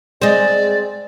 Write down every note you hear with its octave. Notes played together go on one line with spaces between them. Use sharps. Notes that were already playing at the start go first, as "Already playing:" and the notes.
G#3 C4 D5